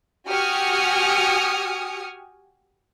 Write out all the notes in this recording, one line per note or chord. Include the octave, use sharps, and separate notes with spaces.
F#4 G4 G#5 D#6 F6 C#7